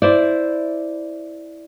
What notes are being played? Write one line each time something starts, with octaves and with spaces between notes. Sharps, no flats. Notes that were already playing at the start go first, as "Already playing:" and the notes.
E4 C5 D5